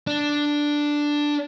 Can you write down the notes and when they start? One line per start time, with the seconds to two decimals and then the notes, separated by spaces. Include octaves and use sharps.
0.07 D4